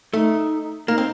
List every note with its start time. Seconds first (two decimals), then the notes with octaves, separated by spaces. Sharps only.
0.13 A3 D#4
0.88 A#3 D#4
0.98 C4